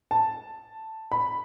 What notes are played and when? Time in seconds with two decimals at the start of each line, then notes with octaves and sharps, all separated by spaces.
0.11 A5
1.12 B5